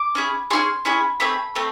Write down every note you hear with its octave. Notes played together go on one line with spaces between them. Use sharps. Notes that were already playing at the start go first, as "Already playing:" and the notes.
Already playing: D6
C#4 E4 G#4
C#4 E4 G#4 C6
C#4 E4 G#4
A3 C4 G#4 B5
A3 C4